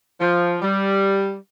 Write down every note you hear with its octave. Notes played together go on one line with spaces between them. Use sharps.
F3
G3